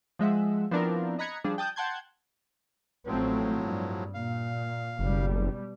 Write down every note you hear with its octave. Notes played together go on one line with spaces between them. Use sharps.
F3 G#3 E5 F#5
F3 B3 C4 D4 E4 A#4
D#5 A#5 B5 F#6 G#6 C#7
F3 G3 D4 G#4
G5 A5 D#6 F#6 G6
F#5 G5 A5 C6 G6 G#6
A1 A2 F3 F#3 A3 C4
G2
A#2 F5
F#1 B2 G3